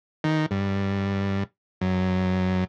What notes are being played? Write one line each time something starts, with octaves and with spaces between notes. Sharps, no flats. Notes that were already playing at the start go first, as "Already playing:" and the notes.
D#3
G2
F#2